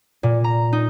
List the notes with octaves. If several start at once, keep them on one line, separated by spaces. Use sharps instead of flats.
A#2
A#5
D#4